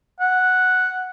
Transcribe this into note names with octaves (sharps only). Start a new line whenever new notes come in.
F#5